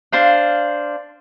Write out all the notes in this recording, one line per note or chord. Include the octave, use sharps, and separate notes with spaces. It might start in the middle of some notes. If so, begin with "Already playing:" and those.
D4 C5 F5